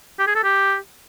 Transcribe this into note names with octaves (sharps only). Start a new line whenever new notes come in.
G4
G#4
A4
G4